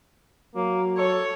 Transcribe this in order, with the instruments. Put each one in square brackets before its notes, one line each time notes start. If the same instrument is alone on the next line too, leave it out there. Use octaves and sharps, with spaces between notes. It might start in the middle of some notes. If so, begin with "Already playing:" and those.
[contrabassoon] F#3 [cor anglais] A#3
[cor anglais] A4 [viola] C#5